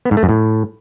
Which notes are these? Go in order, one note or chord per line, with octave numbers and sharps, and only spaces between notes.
B3
G#2
A3
F#2
A2